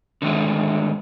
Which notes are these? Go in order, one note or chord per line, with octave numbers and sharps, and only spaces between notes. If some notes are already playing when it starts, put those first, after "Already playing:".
D3 D#3 G#3 A3